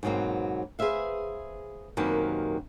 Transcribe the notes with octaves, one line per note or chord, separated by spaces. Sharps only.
G#2 B2 F#3 A#3 C4
G#4 B4 C5 E5 F5
F#2 C3 D#3 A#3 G4 B4